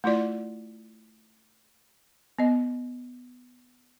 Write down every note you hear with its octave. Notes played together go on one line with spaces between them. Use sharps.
A3 E4 F4 D5
B3 D#5